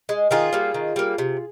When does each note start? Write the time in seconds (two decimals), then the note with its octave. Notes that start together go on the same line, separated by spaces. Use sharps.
0.09 G#3
0.31 D#3 F4 G#4
0.53 G3 A#3
0.74 D#3
0.96 G3 A#3
1.18 C3